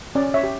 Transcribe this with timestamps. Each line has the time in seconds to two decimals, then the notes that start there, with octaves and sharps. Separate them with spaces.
0.15 C#4 D5
0.34 C#5 E5
0.43 G4